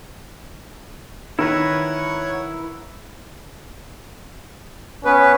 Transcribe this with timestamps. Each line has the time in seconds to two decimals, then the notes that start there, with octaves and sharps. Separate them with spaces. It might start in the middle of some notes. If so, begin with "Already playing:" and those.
1.39 D#3 E4 A#4 B4 C#5 F#5
5.05 B3 C#4 B4